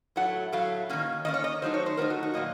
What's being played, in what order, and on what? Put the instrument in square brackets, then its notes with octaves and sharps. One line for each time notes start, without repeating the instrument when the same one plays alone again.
[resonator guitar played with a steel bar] A2 F#3 A3 F#5
A2 F#3 A3 F5
D#3 A#3 C#4
D#3 A#3 C#4 D#5
C#5
D#5
D#3 F#3 A3 D#4 C5
C#5
C5
D#3 F#3 A3 D#4 A#4
F#4
F#4
A#2 F#3 A#3 D#5